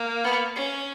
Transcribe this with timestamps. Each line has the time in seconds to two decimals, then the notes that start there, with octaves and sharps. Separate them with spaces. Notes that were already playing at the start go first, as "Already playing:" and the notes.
Already playing: A#3
0.24 B3
0.56 C#4